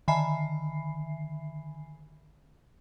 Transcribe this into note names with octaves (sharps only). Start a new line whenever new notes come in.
D3 D#3 E5 G#5 B5 C7